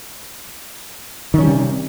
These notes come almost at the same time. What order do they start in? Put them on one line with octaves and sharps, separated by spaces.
D#3 C#4 G3 C3